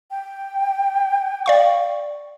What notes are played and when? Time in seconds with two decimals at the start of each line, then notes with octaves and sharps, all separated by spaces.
0.11 G5
1.46 D5 F5 C#6